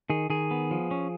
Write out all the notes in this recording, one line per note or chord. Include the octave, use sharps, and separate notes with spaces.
D#3 G#4
D#3 G#4
B3
F3
C#4